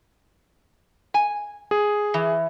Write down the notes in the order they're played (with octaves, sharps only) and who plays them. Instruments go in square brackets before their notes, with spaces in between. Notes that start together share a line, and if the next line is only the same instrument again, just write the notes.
[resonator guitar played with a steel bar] G#5
[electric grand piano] G#4
[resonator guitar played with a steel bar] E3